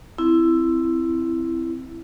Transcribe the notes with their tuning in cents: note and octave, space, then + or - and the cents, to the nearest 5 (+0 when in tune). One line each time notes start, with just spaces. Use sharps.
C4 +0 E4 +10